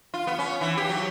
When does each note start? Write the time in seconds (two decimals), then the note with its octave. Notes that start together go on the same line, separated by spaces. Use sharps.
0.14 F4
0.27 B3
0.39 C#4
0.61 E3
0.77 G4
0.89 F#3